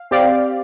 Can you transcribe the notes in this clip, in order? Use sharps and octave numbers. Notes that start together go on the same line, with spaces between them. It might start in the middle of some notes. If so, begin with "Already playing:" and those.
Already playing: F5
C4 G4 D5 F5